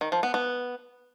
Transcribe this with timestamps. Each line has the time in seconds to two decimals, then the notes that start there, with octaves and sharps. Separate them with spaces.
0.01 D#3
0.12 F3
0.23 B3
0.34 B3